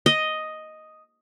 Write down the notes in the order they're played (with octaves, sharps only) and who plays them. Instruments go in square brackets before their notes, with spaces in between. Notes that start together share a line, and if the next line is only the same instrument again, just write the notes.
[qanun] D#5